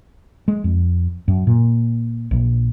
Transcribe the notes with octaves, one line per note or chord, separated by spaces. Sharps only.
G#3
F2
F#2
A#2
A#1